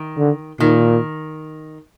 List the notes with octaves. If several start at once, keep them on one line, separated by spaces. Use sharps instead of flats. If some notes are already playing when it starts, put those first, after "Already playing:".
Already playing: D#3
D3
A#2 D#3